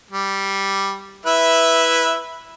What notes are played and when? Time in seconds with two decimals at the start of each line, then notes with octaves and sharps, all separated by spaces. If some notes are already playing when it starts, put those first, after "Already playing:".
0.11 G3
1.26 E4 B4 E5